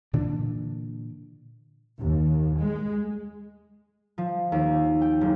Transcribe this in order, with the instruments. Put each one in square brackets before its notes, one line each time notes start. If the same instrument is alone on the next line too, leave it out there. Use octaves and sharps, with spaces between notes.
[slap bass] A#2 D3 E3 D4
[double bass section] D#2
G#3
[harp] F3
D#2
G5
F#1